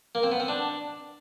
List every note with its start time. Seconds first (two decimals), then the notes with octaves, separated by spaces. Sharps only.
0.15 A#3
0.23 C4
0.32 B3
0.40 C4
0.48 D4